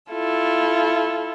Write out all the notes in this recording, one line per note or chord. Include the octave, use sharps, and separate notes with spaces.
E4 F4 A4